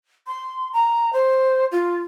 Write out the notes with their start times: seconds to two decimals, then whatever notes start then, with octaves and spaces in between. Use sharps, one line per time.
0.27 C6
0.73 A#5
1.13 C5
1.72 F4